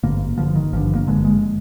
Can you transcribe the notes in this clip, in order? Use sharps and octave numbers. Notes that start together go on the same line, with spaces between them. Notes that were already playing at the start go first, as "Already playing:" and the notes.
G#1 G2 D3 A#3
G#1 G2 D3 F3
D#3
G#1 G2 D3 F3
A#3
G#1 G2 D3 G#3
G#3